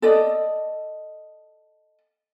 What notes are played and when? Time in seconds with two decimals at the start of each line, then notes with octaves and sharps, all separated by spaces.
0.02 A4 D5 D#5